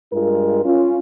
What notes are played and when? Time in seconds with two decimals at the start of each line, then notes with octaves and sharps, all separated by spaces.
0.12 G2 G#3 F4 A#4
0.65 C#4 F4